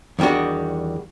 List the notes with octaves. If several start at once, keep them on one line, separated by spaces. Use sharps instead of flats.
E2 D#3 G3 D4 F#4